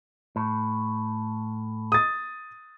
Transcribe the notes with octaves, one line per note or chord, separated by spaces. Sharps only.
A2
D#6 A6